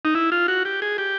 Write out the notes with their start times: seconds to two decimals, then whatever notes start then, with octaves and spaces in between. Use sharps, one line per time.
0.05 D#4
0.15 E4
0.32 F4
0.48 F#4
0.65 G4
0.82 G#4
0.98 G4